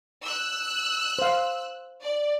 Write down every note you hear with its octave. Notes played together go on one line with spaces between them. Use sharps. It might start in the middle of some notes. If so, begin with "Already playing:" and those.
E6 F#6
C5 F5
D5